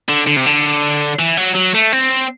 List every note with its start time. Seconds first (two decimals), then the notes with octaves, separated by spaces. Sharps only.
0.09 D3
0.27 D3
0.36 C3
0.46 D3
1.19 E3
1.37 F#3
1.55 F#3
1.74 A3
1.92 C4